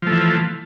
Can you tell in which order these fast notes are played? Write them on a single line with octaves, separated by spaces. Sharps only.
F3 A3 E3